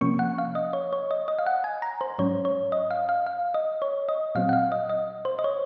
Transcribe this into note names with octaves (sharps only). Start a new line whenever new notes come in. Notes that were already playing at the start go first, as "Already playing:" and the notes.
C3 F3 A#3 C#4 C#6
F#5
F5
D#5
C#5
C#5
D#5
D#5
F5
F#5
G#5
A#5
C5
G#2 F#3 C#4 C#5
C#5
D#5
F5
F5
F5
D#5
C#5
D#5
A#2 F#3 C4 F5
F#5
F5
D#5
D#5
C5
D#5
C#5